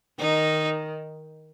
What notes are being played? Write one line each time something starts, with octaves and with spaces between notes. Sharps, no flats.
D#3 D#4